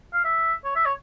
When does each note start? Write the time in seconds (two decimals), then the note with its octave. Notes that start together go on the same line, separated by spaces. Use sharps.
0.13 F5
0.25 E5
0.65 C#5
0.76 E5
0.86 C#5